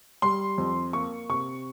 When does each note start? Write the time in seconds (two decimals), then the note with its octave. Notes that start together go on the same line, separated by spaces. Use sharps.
0.22 G3 C6
0.58 F2
0.93 A#3 C#6
1.29 C3 C#6